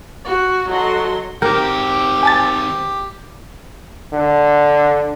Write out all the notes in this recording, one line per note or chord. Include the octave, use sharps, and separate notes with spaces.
F#4
F#3 F#4 A4 D#5 C6
D#3 C4 G4 A#4 G5
G#5 A5 A6
D3